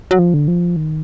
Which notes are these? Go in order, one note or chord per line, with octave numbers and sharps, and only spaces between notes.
F#3
F3
D3
F3
D#3